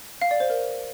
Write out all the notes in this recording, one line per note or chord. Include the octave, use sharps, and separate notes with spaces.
F5
D5
C5
A#4